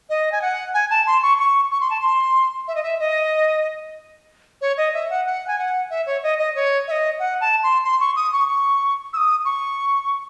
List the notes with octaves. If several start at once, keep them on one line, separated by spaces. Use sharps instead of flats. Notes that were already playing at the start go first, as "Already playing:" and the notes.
D#5
G#5
F#5
G#5
A5
C6
C#6
C#6
C#6
C6
A5
C6
E5
D#5
E5
D#5
C#5
D#5
E5
F#5
F#5
G#5
F#5
E5
C#5
D#5
D#5
C#5
E5
D#5
F#5
A5
C6
C6
C#6
D#6
C#6
C#6
E6
D#6
C#6